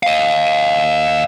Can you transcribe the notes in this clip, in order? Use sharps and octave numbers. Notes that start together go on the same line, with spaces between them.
D#5 F5